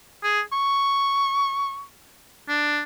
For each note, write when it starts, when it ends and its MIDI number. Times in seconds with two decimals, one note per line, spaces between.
0.23 0.41 68
0.52 1.84 85
2.49 2.83 62